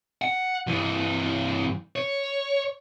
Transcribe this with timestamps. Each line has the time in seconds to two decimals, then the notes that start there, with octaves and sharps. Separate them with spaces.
0.22 F#5
0.67 G2 E3
1.96 C#5